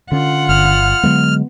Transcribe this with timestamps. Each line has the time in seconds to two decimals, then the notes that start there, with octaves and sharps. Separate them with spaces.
0.12 D3 C#4 F4 F#5
0.49 G1 F6
1.03 D3 F#3 G#3 B3